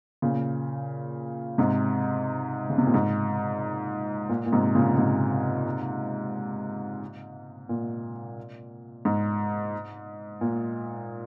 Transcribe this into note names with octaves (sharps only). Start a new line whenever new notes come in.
A#2 C#3
G#2 C3
C#3
C3
A#2
G#2
A#2
A#2
G#2 C3
A#2 C#3
G#2 C3
A#2
G#2
A#2